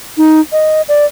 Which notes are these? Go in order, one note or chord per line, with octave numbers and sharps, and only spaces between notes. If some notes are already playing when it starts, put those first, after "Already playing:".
D#4
D#5
D5